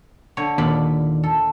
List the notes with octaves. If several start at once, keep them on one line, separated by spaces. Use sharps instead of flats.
D3 C#5
D#2 A#2 D5 B5
A4